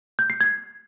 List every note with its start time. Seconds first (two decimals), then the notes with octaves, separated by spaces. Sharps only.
0.19 G6
0.30 C7
0.41 G#6